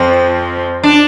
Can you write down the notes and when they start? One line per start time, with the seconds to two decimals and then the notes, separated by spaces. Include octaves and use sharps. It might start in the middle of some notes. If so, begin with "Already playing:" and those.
Already playing: F2 F3 C4
0.84 D4